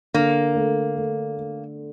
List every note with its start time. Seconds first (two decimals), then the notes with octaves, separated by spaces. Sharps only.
0.14 D3 A#3
0.55 A3
0.97 A3
1.38 A3